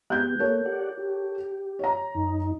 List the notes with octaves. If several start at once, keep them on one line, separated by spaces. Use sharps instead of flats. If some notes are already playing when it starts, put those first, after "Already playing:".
G#3 B3 G4 F#6 G6
A#3 A4 A#4 C#5
G4 D5 F#5
G4
C#5 A#5
F#2 D#4